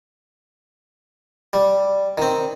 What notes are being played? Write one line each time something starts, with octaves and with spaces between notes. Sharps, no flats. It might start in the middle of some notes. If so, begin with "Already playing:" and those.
G3
D#3 C4